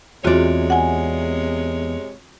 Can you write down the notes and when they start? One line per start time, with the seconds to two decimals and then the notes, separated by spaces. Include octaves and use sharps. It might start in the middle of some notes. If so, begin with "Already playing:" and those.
0.24 E2 C3 G#3 C4 F4 F#4 C#5 D5
0.70 F#5 G#5